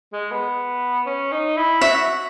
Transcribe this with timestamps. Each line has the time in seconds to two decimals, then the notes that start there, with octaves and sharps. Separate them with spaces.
0.13 G#3
0.31 B3
1.06 C#4
1.32 D#4
1.57 E4
1.81 F#4 E5